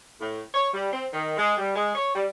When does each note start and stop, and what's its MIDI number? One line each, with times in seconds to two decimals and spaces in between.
0.20 0.41 45
0.54 0.68 73
0.73 0.87 55
0.92 1.06 60
1.13 1.36 51
1.38 1.53 56
1.57 1.74 55
1.75 1.91 56
1.95 2.11 73
2.14 2.26 55